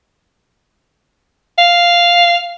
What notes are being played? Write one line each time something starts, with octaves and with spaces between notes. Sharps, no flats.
F5